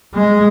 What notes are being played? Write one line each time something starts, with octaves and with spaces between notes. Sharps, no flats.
G#3